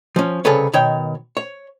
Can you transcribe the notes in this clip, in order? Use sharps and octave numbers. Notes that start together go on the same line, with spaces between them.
F3 C#4
C2 C#3 G#4 A4 B4 C#5
B2 D#3 C#5 G5
C#5